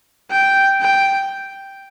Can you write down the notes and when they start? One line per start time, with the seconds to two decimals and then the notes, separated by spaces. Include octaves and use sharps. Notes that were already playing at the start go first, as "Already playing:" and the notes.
0.31 G5
0.81 G5